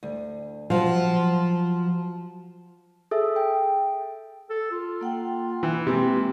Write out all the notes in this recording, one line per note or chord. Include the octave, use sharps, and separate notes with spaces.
D2
F3 F#3 F5
G#4 A4 E5
G5
A4
F4
A#3 F#5 G5
E3
C3 G#3 A#3 B4